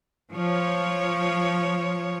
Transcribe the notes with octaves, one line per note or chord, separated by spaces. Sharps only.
F3 C#5